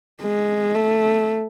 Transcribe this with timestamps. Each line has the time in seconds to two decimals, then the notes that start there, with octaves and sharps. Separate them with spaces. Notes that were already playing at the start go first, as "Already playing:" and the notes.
0.23 G#3
0.75 A3